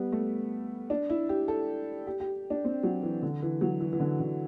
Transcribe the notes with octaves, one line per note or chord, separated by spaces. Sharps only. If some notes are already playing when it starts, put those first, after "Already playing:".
Already playing: G3 B3
A3
D4
E4
G4
A4
G4
G4
D4
C4
F#3
E3
D3
E3
F#3
E3
E3
D3
D3